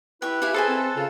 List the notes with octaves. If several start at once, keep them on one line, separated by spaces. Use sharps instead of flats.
E4 G4 B4 C#6
E4 G4 F5 G#5
G#4 A4 C5 D#5 G#5
C4
C#3 F4